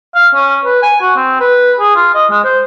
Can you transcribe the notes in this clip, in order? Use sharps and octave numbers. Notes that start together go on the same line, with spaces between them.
F5
C#4
B4
G#5
F#4
C4
B4
G#4
F4
D#5
G#3
C5